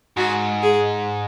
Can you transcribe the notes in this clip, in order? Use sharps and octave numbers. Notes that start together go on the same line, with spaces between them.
G#2 F#4
G#4